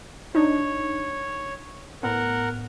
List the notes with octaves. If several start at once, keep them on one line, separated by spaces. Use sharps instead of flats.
D4 D#4 C#5
A2 B3 A#4 F#5